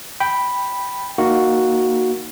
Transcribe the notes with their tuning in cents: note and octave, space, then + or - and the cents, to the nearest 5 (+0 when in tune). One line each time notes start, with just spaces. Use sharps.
G5 +0 B5 +0
A#3 +0 D#4 +0 F#4 +0